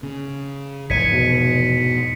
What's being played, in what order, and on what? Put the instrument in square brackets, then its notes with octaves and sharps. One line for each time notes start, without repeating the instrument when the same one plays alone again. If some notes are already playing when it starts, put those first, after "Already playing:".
[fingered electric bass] C#3
[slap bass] F1 E2 [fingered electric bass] G#2 [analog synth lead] G#6 [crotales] B6 C#7 D#7
[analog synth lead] B2